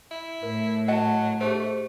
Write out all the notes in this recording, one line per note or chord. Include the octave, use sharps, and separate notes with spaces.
E4
A2 A#4
F#3 D#5 F#5 A5
A3 G4 G#4 C5